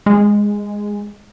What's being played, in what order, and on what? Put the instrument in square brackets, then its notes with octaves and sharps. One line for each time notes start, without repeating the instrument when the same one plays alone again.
[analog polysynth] G#3